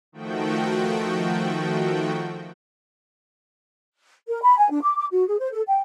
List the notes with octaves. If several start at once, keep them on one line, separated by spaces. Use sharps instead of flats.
D#3 F3 A3 F#4 G5
A#4
B5
G#5
D4
D6
D6
F#4
G#4
C5
A4
G5